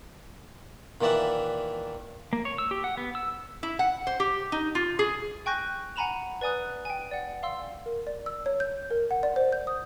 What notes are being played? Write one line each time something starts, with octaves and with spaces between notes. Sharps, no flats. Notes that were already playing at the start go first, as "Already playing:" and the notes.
A#2 D#3 E3 D5 E5 F#5
A#3
C#5
E6
G4
F#5
B3
E6
E4
F#5
C5
G4
D#4
F4
G#4
G5 G#5 C#6 F#6 G6 A#6
F#5 G#5 A#5 B5 E7 F7
B4 D5 G#5 D#6 F#6
G5 G#5
D5 F#5
F5 C6 E6
A#4
D5
E6
C#5
G6
A#4
F#5
D5
C5
G6
D#6